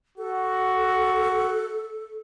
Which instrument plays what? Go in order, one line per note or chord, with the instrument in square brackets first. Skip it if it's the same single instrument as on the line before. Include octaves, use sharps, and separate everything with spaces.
[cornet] F#4 [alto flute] A4